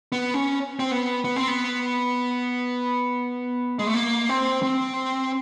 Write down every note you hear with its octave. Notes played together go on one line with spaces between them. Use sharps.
B3
C#4
C4
B3
B3
C4
B3
G#3
A3
A#3
C4
C4